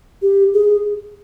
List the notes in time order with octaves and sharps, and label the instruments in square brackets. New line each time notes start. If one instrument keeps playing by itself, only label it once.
[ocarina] G4
G#4